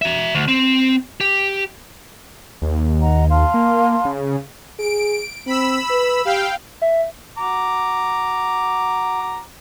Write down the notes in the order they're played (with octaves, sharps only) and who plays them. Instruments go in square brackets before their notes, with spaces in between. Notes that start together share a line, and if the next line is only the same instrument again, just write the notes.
[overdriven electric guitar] F#4 E5
D2
C4
G4
[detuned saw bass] D#2
[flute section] D#5 F#5 A#5
F5 A5 C6
[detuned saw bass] A#3
C#3
[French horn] G#4 [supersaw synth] D7
[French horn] C4 [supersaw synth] B5 E6
[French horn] B4
[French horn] G4 [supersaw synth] F5 G5
[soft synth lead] E5
[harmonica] F#4 A#5 D6